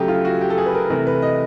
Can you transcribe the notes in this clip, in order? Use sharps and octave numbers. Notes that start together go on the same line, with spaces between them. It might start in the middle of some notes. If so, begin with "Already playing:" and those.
Already playing: C#3 F#3 A3 G4 G#4
F4
F#4
G4
A4
G#4
B4
A#4
C3 E3 A3 A#4
B4
D#5